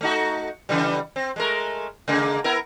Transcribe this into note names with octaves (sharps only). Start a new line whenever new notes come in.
A3 D#4 F#4
C#3 E3 G3
C4
G#3 A3 A#4
C#3 G#3 A#3
B3 E4 A#4